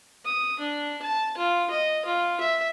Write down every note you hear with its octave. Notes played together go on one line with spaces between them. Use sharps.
D#6
D4
A5
F4
D#5
F4
E5